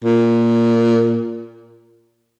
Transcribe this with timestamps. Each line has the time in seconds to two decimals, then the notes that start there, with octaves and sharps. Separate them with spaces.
0.05 A#2